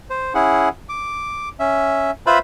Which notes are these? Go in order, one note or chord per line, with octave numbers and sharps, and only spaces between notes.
C5
C#4 E4 G#4 F#5
D6
C#4 E5
F4 B4 C5 E5 B5